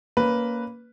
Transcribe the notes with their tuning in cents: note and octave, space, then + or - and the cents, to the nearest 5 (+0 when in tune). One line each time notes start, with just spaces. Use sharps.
A#3 +0 C#4 +20 B4 +0